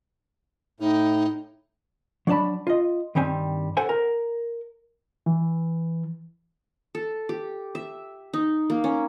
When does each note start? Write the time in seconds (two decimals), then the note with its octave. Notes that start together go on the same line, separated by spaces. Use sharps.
0.80 A2 D#4
2.27 F#3 D4 D5 A5 B5
2.67 F4 D#5
3.15 G2 D#3 G3 C4 G#5
3.77 A4 C5 F#5 G#5
3.89 A#4
5.26 E3
6.95 A4
7.29 G4
7.75 E5
8.33 D#4
8.70 A#3
8.84 C#4